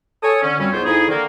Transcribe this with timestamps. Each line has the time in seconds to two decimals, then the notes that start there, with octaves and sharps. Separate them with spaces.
0.23 A4 C#5 G#5 D#6
0.43 D3 C#4
0.59 F#2 A#2 G3 C4 C#4
0.73 C2 G#2 B3 F4 C5 C#5
0.85 F2 F3 D#4 E4 G#4
1.08 D3 D#3 A#3